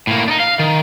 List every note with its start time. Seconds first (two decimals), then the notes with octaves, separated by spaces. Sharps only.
0.07 A2 A#3
0.28 D4 D#4
0.40 F5
0.59 D#3